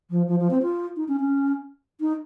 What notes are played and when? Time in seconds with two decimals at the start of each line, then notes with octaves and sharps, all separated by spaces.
0.10 F3
0.28 F3
0.40 F3
0.50 C4
0.62 F4
0.96 D#4
1.08 C#4
1.20 C#4
2.00 D#4